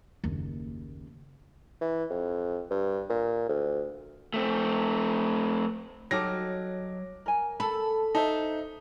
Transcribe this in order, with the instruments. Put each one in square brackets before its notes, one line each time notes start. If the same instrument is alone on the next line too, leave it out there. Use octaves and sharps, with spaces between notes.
[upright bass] F#1 D#2
[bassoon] E3
F2
G2
A#2
D2
[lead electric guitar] A3 C4
[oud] F#3 [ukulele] D#4 G4 A4 [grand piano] D6 F6 A#6
[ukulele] A#4 G#5
[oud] A4 [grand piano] B5
[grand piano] D#4 [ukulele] C5 E5 A5